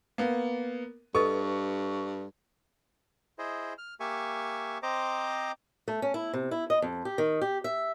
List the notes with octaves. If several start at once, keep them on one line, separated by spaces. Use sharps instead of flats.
A#3 B3
G2 A4 B4 D#5 C#6
E4 G#4 C5 D#5
F6
A#3 G4 E5 G#5 C#6
C4 C5 D#5 A#5 D6
A3
C#4
E4
C3
E4
D#5
F2
G4
D#3
G4
E5